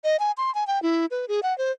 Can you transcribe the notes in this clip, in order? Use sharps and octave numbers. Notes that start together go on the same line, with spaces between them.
D#5
G#5
C6
G#5
G5
E4
B4
G#4
F#5
C5